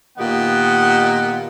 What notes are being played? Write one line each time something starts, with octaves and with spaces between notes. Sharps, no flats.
A#2 D#3 B3 G4 D#5 F#5